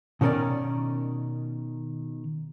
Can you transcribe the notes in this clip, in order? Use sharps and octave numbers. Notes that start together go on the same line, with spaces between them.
B2 D#3 C#4 A#4 D5